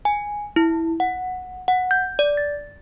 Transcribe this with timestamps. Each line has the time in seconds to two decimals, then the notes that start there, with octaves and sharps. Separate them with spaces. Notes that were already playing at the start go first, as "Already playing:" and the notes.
0.05 G#5
0.56 E4
1.00 F#5
1.68 F#5
1.91 G6
2.19 D5
2.37 A6